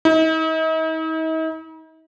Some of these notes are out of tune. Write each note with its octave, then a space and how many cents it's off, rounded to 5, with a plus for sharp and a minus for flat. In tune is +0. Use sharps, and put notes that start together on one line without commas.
D#4 +45